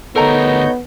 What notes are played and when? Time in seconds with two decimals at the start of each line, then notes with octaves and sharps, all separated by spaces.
0.16 D2 B3 D#4 A4 A#4 C#5 A#5 G6